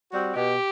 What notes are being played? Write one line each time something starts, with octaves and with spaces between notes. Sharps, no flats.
G3 C4 F#4
B2 G4